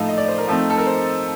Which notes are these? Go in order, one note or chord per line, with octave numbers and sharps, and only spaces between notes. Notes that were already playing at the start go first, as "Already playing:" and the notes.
Already playing: A2 F3 A3 D#4 F5
D#5
D5
C5
A#4
F3 A3 C4 D#4
A4
A#4
C5